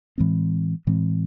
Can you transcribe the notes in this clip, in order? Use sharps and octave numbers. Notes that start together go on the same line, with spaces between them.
A2 E3 G#3 C4
A2 E3 G#3 C4